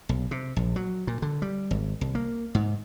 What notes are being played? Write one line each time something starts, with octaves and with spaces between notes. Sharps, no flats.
B1
C3
A#1
F#3
A#2
D3
G3
G#1
C2
A#3
G#2